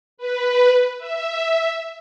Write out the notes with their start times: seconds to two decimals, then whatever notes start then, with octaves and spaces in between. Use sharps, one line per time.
0.18 B4
0.98 E5